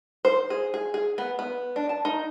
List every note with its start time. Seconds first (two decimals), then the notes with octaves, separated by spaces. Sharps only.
0.25 C5
0.50 G#4
0.74 G#4
0.94 G#4
1.18 B3
1.39 B3
1.76 D4
1.89 A5
2.05 D#4